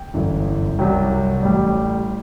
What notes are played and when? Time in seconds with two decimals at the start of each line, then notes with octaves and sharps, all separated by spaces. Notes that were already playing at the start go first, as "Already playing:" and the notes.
Already playing: G5
0.14 G1 F#2 E3
0.79 C2 C3 F#3 G5
1.42 A1 A2 G3